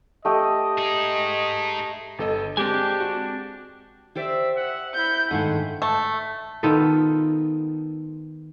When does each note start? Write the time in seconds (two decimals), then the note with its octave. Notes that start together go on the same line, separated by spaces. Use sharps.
0.25 A3 G4 D#5 D#6
0.77 D#4 G#4
2.19 G1 A4 D#5
2.57 G#3 C4 D4 G4 G#5
3.00 F#4
4.15 G4 C5 D5 E5
4.54 E5 F#5
4.94 E4 B5 G6
5.31 G#2 D3 D#3 A3 F5 F#5 G#5
5.82 A3
6.63 D#3 B3 F4 A4